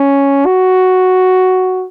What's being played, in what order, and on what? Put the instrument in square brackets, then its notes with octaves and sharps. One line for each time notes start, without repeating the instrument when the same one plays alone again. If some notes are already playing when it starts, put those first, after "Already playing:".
Already playing: [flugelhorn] C#4
F#4